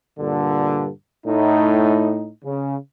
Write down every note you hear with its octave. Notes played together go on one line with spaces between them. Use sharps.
G2 A#2 D3
A2 D#4
C#3